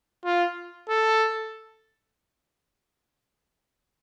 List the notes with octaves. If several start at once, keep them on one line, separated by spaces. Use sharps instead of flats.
F4
A4